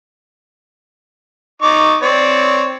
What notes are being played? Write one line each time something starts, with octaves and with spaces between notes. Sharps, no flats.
D#4 C#6 D6
C4 C#5 D5